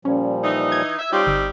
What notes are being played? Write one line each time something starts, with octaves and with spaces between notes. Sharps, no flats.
A#2 F3 G3 C#4
E3 D#4
G#6
E5
G3 C4 D#4 F4 G4 C#5
G1 E6